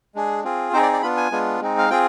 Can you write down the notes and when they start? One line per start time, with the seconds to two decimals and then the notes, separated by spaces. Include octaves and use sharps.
0.15 G#3 D4 G#4
0.44 C4 F4 G#4
0.73 C4 D#4 G#4 C5
0.83 D5
0.93 D5
1.02 B3 D4 F4 B5
1.17 G#5
1.31 G#3 B3 D4 F4
1.61 G#3 C4 D#4
1.78 F5
1.90 C4 F4 G#4 G5